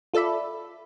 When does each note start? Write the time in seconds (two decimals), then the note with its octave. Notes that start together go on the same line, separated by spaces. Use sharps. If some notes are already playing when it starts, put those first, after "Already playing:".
0.14 F4 A4 D5 E5 B5